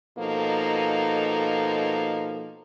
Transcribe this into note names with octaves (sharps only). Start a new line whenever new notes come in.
B2 F3 A#3 D#4 A4